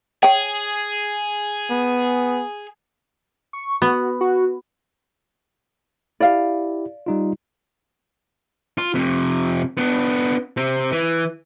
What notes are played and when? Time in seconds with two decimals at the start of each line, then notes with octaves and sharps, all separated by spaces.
0.23 G#4 C#5 G5
1.70 B3
3.53 C#6
3.82 B3 F#4
4.21 F#4
6.20 E4 G4 D5 F5
7.06 G3 D#4 F4
8.78 F4
8.94 F2 C3
9.77 B3 D4
10.57 C3 C4
10.92 E3